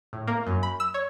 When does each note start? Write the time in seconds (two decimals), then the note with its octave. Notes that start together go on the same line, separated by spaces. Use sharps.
0.13 A2
0.28 A#3
0.47 F#2
0.63 B5
0.80 E6
0.94 C#5